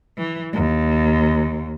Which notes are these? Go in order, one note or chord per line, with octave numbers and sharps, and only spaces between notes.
E3
D#2